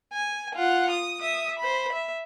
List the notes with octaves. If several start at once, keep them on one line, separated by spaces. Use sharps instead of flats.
G#5
F4 F#5
D#6
E5 D#6
C5 B5
E5